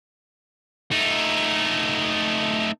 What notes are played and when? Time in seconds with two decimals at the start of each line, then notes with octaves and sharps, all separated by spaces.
0.91 A3 D#4